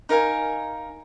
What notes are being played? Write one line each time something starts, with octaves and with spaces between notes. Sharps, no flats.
D#4 A#4 F5 G#5